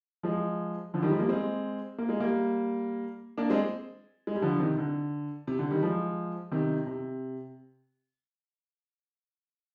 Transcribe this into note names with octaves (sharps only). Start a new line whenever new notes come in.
F3 G#3
D3 F3
D#3 G3
F3 G#3
G3 A#3
G#3 C4
A#3
G#3
G3 A#3
A#3 D4
G#3 C4
G#3
G3
D3 F3
C3 D#3
D3
C3
D3
D#3 G3
F3 G#3
C3 D#3
C3